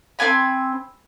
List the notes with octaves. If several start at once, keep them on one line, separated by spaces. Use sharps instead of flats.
C4 E4 G#5 B5